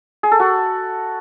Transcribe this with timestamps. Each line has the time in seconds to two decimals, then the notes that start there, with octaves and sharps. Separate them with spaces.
0.23 G#4
0.31 A4
0.40 F#4